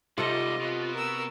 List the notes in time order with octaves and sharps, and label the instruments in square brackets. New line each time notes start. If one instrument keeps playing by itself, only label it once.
[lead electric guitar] G#2 G3 [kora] C3 A4 F#5 [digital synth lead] F4 [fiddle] D#5
[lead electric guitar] B2 B3
[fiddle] A#4 E6